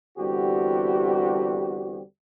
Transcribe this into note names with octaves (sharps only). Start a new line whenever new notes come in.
E2 D3 G3 C4 F#4 G4